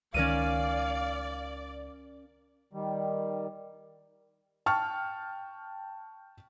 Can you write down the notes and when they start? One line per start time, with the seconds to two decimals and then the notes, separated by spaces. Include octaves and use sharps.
0.14 C#2 D#3 C#4 A#4 D5 F5 D#7
2.73 D#3 G3
4.66 G5 A5 C#6 F6